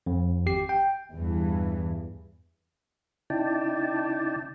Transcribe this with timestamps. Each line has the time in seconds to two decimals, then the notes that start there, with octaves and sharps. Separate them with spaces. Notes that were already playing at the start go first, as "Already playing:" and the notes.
0.06 F2
0.46 G#1 G4 C7
0.69 G5
1.14 E2 G2 E3
3.30 C#3 D#4 E4 D5 G5 A5